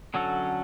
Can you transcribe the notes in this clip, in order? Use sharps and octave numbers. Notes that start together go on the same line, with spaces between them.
D3 F#3 C#4 F#4 A4